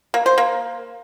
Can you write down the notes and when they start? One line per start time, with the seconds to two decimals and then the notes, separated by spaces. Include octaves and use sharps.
0.14 A#3
0.26 C5
0.38 A#3